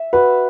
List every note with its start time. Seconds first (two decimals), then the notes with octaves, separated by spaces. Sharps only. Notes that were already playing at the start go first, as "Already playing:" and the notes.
Already playing: E5
0.13 F#4 B4